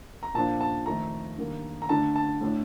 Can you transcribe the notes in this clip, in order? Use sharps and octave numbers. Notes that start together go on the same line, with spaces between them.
A#5
A#2 F3 A#3 D4 A5
A5
F2 D#3 A3 A#5
G2 D#3 A#3
A#5
D3 A3 D4 A5
A5
A2 A3 D4